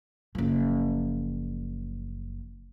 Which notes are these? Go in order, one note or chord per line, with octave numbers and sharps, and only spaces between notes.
F#1 F3